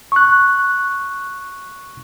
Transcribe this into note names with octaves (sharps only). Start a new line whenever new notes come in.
C#6 F#6